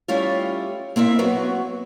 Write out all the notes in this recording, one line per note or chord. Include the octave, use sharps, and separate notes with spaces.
G3 A3 C#4 E4 F4
A#3 C4 E4 E5
F#3 B3 F#4 B4